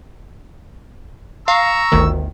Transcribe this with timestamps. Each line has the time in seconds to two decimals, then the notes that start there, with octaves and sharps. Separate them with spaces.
1.48 F5 A#5 C#6 E6
1.92 G1 D2 D#3